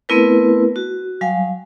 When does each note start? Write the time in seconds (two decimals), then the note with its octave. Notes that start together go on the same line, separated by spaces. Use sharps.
0.09 A3 B3 C4 E4 A#4 B4
0.76 F#4
1.21 F#3 G3 F5 G#5